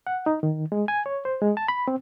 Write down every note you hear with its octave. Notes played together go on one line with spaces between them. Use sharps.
F#5
D#4
D#3
G#3
G#5
C#5
C5
G#3
A5
B5
C4